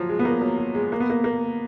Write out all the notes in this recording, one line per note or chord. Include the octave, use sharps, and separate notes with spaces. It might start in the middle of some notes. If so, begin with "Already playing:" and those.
Already playing: F3 F#3
G#3
B3
A#3
F#3
F#3
G#3
A#3
B3
A#3
A#3